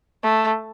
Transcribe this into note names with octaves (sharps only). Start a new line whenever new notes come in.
A3